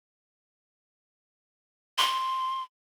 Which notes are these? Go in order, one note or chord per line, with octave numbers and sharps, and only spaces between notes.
C6